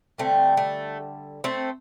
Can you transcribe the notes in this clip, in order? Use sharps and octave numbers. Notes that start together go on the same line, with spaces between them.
D3 G3 A3 C4
A3
A3 C4